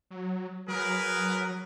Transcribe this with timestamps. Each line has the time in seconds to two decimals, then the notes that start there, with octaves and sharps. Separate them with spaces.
0.11 F#3
0.68 F#3 G#4 A#4 B4